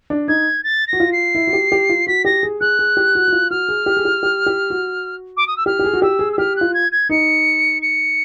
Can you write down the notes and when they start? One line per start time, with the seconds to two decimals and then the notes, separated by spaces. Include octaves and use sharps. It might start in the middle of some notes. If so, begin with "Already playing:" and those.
0.10 D4
0.28 D#4 G#6
0.63 A6
0.87 A#6
0.93 F#4
1.00 F4
1.12 C7
1.35 E4
1.47 F#4
1.53 G4
1.72 G4
1.89 F4
2.07 F#4 B6
2.25 G4 A#6
2.43 G#4
2.60 G#4 F#6
2.79 G#4
2.97 G4
3.15 F#4
3.28 F#4
3.33 F4
3.50 F#4 F6
3.69 G#4
3.86 G4
3.97 G#4
4.05 G4
4.23 G4
4.46 G4
4.70 F#4
5.37 D6
5.47 D#6
5.56 E6
5.66 G4 F6
5.79 G4
5.85 G#4
5.93 F#4
6.02 G4 E6
6.19 G#4
6.32 E6
6.38 G4 F6
6.56 F#6
6.61 F4
6.74 G#6
6.91 G#6
7.10 D#4 C#7
7.82 C#7